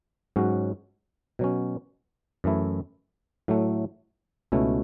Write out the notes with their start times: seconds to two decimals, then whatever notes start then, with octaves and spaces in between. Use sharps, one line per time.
0.36 G#2 F#3 C#4 F#4
1.39 B2 F#3 C#4
2.44 F#2 E3 A3 E4
3.48 A2 F#3 A3
4.52 C#2 B2 A3 C#4 E4